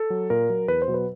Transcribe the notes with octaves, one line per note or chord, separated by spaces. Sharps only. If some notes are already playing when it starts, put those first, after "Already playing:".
Already playing: A4
F#3
A#2 A#4
F#3
E2 B4
C5
B2 F#3
B4